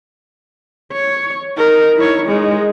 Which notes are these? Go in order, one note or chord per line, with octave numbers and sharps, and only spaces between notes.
C#5
D#4 A#4
E4 C#5
G#3 D#4